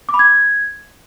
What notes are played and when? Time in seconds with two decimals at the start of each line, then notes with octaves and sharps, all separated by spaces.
0.09 D6
0.14 B5
0.19 G#6